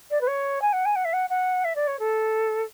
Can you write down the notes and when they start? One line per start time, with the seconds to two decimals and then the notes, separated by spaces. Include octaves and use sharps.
0.10 D5
0.21 B4
0.27 C#5
0.61 G#5
0.73 F#5
0.85 G#5
0.95 F#5
1.04 E5
1.13 F#5
1.29 F#5
1.64 E5
1.75 D5
1.87 C#5
1.99 A4